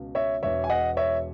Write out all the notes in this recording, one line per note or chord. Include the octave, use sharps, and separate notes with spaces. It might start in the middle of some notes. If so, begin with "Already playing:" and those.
Already playing: C#2 B2
C#5 E5
E1 E2 B2 C#5 E5
G#5
D#5 F#5
C#5 E5